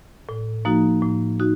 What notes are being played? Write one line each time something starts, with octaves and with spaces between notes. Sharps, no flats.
A2
F3 A#3 D#4 F#4
A2
D#4 F#4